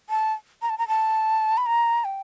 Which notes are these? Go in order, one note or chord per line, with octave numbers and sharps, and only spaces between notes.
A5
A#5
A5
A#5
A5
B5
A#5
G5